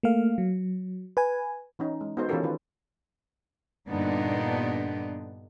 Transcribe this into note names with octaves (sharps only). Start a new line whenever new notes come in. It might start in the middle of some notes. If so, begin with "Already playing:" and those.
A3 A#3 F5
F#3
B4 G#5
E3 C#4 D#4
G#3
B3 D#4 F#4 A4 C5
E3 C#4 F4 G4 A4 A#4
D#3 F4 B4
G2 A#2 D3 B3 D4 D#4